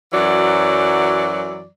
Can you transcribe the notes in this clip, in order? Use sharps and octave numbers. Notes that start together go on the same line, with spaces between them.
F#2 E3 F#3 F#4 D5